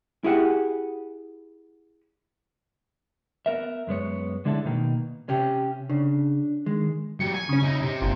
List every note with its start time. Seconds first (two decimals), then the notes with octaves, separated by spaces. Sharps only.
0.24 E4 G4 G#4 F#5
3.46 B3 A#4 E5
3.87 F#2 G#3 B3 C#5
4.45 D3 G#3 D4 E4 A4
4.65 B2 D#3 A#3
5.29 C3 C#4 G4
5.90 C#3 D4
6.66 D#3 G#3
7.20 F#3 G4 C#7
7.34 G#5
7.49 C#3 C#4
7.63 D#4 E4
7.82 C3
8.02 G1 A#2